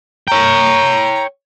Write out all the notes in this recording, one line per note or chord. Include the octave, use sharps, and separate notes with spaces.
C#5 G5 A#5